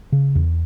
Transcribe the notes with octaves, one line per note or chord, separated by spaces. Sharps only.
C#3
E2